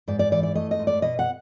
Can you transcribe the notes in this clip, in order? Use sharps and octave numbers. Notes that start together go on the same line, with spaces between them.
G#2 D5
D5
E3 D5
D5
A3 D#5
D#5
G#2
D5
B2 D#5
F#5